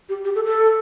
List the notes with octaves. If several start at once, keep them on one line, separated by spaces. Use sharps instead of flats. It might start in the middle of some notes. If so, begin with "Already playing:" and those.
G4
G4
A4
A4